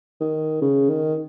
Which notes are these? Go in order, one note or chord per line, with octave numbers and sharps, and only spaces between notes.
D#3
C#3
D#3